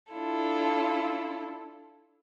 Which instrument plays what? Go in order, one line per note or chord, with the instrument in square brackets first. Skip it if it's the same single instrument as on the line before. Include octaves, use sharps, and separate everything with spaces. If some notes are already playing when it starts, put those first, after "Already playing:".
[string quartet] D4 E4 F4 A4